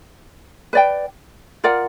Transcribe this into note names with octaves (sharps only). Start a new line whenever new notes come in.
B4 D5 G5
F4 A#4 D5 F#5